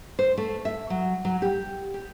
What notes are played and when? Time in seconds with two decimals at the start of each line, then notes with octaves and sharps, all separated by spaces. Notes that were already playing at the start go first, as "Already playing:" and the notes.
0.19 C5
0.38 A3
0.65 E5
0.90 F#3
1.25 F#3
1.42 G4
1.94 G4